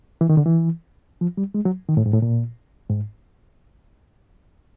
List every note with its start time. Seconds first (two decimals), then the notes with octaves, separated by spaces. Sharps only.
0.21 E3
0.29 D#3
0.37 D3
0.46 E3
1.21 F3
1.37 G3
1.54 G#3
1.65 F#3
1.88 D#3
1.97 A2
2.06 G#2
2.13 A2
2.22 A#2
2.89 G#2